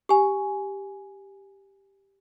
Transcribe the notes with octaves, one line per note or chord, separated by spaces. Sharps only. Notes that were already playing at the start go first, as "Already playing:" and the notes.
G4 G#5